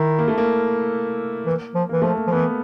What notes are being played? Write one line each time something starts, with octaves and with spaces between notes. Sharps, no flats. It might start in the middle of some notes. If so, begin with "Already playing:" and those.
Already playing: D#3 E4
A#3
A3
A#3
E3
F3
E3 A#3
F3 A3
A#3
F3
E3 B3